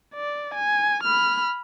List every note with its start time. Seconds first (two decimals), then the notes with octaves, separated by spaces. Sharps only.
0.15 D5
0.54 G#5
1.03 B5 F6